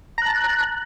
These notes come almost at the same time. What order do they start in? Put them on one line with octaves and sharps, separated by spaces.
A#5 F#6 A5